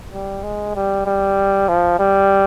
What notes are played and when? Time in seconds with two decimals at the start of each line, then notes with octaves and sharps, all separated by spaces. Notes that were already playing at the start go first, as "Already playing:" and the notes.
0.13 G3
0.44 G#3
0.75 G3
1.06 G3
1.69 F3
1.99 G3